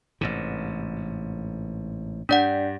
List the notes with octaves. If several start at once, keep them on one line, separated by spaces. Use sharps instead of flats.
A1 G#2 C3
G2 D4 D5 F#5